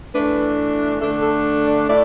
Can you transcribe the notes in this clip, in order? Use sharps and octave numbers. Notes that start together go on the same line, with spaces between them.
E3 A3 D4 B4
D3 A3 D4 A4
A4
D5
A2 A3 E4 D5